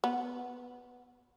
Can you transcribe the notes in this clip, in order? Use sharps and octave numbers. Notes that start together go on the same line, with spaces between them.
B3